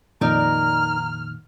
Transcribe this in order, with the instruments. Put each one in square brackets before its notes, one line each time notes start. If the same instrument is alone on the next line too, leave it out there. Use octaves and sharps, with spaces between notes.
[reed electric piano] F2 A#2 D#3 [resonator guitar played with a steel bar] D#4 A#4 D5 [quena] A#5 [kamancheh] F6